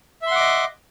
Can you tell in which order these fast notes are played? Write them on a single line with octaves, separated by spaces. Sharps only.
E5 C6 F#5 D6 D#5